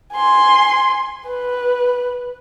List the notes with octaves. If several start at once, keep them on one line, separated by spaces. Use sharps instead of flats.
G#5 C6
B4